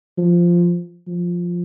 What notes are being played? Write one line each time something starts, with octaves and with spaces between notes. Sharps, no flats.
F3
F3